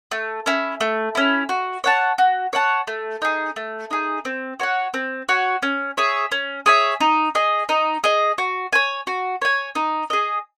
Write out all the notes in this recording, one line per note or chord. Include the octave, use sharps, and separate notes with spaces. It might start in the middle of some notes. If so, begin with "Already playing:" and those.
A3
C#4 E4
A3
C#4 E4
F#4
C#5 F#5 A5
F#4
C#5 F#5 A5
A3
D#4 G#4
A3
D#4 G#4
C4
F#4 C#5 F#5
C4
F#4 C#5 F#5
C#4
G#4 C#5 E5
C#4
G#4 C#5 E5
D#4
G#4 D#5
D#4
G#4 D#5
F#4
C#5 G#5
F#4
C#5 G#5
D#4
G#4 D#5